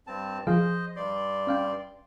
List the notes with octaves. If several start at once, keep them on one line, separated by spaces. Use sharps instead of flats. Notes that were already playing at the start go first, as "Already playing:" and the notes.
G2 C4 A5
F3 G#4 C5 D#5 F5
G2 D5 C6
C#4 F5 G5